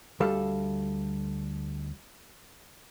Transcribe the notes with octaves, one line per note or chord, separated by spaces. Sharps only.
D2 G3 A4 F5